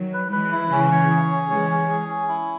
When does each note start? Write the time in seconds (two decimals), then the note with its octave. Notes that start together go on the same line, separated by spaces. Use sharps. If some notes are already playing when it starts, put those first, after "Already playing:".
Already playing: D#3 F#3
0.13 B4
0.32 E3 G#3 B4
0.52 E4
0.71 C#3 E3 C#4
0.91 C#5
1.11 G#4
1.31 C#4
1.50 E3 G#3 C#5
1.70 C#4
1.89 G#4
2.09 C#4
2.29 E4